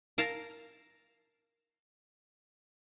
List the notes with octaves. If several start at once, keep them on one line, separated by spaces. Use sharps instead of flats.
A#4 F5 A5 A#5